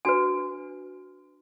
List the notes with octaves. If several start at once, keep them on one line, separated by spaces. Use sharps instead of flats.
D4 F#4 B4 G#5